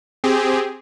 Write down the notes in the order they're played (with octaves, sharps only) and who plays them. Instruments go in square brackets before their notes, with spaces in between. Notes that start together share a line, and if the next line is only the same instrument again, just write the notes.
[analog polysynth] C4 G4 G#4